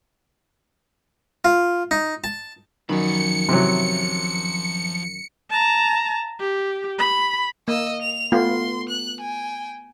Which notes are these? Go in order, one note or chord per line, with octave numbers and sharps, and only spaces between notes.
F4
D#4
A5
F#2 D#3 F3 B5 C#7
C3 E3 F#3
A5 A#5
G4
B5
A#3 D#5 E6
F7
A3 B3 F4 C6
F#6
G5 G#5